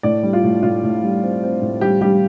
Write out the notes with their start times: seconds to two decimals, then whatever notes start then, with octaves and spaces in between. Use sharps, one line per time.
0.03 A2 D5
0.23 G3
0.33 F4
0.43 A2
0.63 A2 F4
0.83 A2
1.03 G3
1.23 C4
1.43 C4
1.62 A2
1.81 G3 G4
2.01 G3 G4